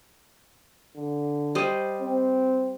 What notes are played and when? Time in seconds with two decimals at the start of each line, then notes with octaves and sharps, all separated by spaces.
0.96 D3
1.55 G3 C5 D#5
2.01 C4